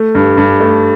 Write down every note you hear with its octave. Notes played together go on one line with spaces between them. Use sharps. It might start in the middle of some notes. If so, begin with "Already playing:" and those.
Already playing: A3
G2
G2
A3